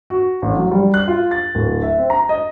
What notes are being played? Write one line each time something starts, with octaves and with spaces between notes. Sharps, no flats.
F#4
A1
F#3
G3
F#6
F4
A6
D1
E5
C4
A#5
D#5